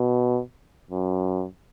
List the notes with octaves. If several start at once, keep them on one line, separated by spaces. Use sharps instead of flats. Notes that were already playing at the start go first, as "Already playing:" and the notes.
Already playing: B2
F#2